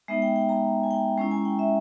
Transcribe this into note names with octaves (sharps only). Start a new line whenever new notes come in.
G#3 B3 D#4 E5
G5
G5
A#5
G#5
G5
G#3 C#4 E4 A#5
G#5
G5
E5